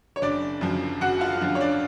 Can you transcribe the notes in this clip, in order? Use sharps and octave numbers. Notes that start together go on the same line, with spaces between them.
C#5
F#1 D4 D5
F#2 D3 F3
F#1 F#4 F#5
F4 F5
F#2 D3 F3
C#5
D4 D5